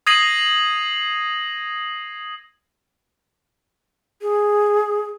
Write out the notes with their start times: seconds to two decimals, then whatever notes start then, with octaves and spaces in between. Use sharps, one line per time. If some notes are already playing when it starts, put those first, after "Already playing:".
0.07 D#6 G#6 A#6 C7 D#7 F#7
4.22 G#4